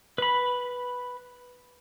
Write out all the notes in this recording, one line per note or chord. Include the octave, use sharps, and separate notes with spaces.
B4 B5